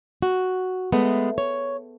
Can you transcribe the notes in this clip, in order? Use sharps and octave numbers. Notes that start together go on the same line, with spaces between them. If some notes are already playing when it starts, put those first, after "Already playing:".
F#4
G#3 A3 B3
C#5